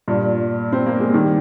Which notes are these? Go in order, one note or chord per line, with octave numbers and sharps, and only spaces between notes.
G2 A#2
C4
A#3
G#3
D#3 G3